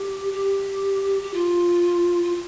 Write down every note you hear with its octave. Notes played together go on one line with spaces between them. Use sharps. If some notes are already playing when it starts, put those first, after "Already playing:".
Already playing: G4
G4
G4
F4
F4